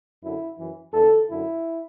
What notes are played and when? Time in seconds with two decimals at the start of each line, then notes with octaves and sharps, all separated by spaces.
0.22 F#2 D3 E4
0.58 F#2 E3
0.93 E2 D3 A4
1.29 F#2 D3 E4